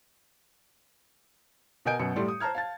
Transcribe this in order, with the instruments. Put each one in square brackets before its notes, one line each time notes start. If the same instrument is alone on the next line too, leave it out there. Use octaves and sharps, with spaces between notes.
[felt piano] B2 A#4 D#5 G#5 G6 D7
F#2 B2 C#7
A2 G3 A4 C6
D#6
C5 A5 A#5 F6 G#6
F5 A5 A6